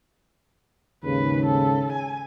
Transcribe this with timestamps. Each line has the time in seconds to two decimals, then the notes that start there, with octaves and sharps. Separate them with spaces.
1.04 D#2 G#2 C#3 B4
1.45 A4
1.92 G#5